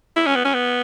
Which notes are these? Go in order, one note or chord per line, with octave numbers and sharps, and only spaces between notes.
E4
C#4
B3
C#4
B3